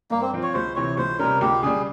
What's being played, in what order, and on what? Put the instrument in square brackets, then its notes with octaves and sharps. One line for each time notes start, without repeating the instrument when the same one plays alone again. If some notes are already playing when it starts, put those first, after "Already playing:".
[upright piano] G2 [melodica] A#3
[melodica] C4
[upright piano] F3 C4 F4
[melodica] C#5
[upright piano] C#2 [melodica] C5
[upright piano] C3 E3 [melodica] C#5
[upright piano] C#2 [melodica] C5
[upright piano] C3 G3 C#4 [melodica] A#4
[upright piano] C#2 [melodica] G4
[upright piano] C#3 G3 [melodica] G#4